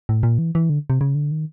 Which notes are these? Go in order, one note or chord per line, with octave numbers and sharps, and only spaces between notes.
A2
A#2
E3
E3
D3
C3
C#3
D3
D#3